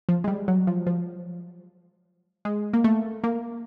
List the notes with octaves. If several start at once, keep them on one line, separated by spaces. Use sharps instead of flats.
F3
G#3
G3
F#3
F3
F3
G#3
A#3
A3
A#3